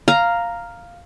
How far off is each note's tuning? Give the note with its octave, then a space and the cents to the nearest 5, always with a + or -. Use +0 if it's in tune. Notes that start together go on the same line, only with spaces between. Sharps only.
F5 +0 A#5 +0